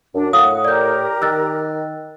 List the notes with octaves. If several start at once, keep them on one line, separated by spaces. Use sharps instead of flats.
F#2 D4
A2 F5 F#5 D#6
G4 A#4 D5 G6
D#3 E6 F#6 A6